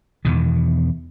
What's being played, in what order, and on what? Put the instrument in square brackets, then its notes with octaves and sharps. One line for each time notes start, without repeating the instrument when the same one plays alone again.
[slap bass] E2 B2 D#3